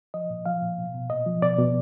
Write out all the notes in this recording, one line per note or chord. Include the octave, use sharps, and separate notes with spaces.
F3 D#5
A#2
F3 F5
A#2
B2
B2
A#2 D#5
F3
B2 D5
B2